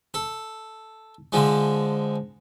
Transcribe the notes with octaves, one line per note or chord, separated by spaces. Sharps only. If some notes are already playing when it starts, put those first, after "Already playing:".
A4
D3 F3 G#3